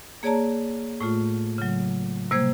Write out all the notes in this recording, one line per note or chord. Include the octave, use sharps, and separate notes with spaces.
A#3 G#4 C#5 D5 A5 A#5
A2 A3 F4
C#3 F#3
C3 G3 A#3 C5 G#6